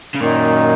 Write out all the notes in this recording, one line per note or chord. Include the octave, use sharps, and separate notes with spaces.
C#3
F#2 A#2 D#3 F#3 D#4